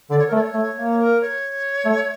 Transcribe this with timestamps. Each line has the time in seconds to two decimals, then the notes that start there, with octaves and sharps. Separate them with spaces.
0.10 D3 D5
0.18 C#5
0.27 A#4
0.32 A3
0.35 D5
0.39 C#5
0.54 A3
0.76 A#3
0.98 A#4
1.20 C#5
1.85 A3